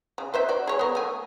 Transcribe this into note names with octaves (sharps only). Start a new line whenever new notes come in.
C#3
B4 C5 E5
F#4 D5
G#4 C#5
B3 A#4
A3 G#5